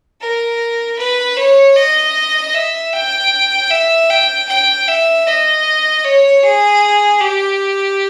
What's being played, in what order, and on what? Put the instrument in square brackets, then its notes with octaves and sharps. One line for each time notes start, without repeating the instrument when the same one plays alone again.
[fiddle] A#4
B4
C#5
D#5
E5
G5
E5
G5
G5
E5
D#5
C#5
G#4
G4